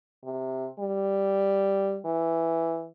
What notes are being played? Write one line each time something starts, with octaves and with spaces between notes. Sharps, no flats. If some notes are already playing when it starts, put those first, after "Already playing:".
C3
G3
E3